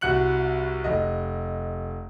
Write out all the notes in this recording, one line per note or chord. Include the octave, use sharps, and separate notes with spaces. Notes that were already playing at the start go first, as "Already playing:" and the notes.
C2 F#4 F#6 C#7 F#7
F1 D#5